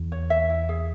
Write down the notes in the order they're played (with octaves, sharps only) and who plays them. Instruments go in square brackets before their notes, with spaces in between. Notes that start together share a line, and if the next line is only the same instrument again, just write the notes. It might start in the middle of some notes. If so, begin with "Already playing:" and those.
Already playing: [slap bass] E2
[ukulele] C#5
E5
E4
G#4